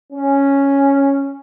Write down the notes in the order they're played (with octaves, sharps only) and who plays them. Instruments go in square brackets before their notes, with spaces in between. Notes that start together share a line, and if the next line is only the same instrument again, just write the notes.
[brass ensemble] C#4